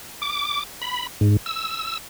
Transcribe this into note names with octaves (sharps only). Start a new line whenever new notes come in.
D6
B5
G#2
E6